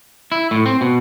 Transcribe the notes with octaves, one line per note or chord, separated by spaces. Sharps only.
E4
A2
C4
B2